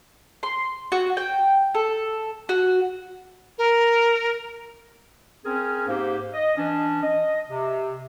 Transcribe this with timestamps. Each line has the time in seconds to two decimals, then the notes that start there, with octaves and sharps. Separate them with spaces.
0.43 C6
0.92 F#4
1.17 G5
1.75 A4
2.49 F#4
3.58 A#4
5.45 C4 C#4 G#4 A#4
5.88 G#2 A#3 G4 C5
6.33 D#5
6.57 E3 C#4 D4
7.03 D#5
7.50 C3